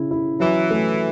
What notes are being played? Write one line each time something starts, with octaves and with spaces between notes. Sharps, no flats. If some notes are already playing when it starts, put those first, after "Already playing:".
Already playing: C#3 E4
E4
E3 F#3
A3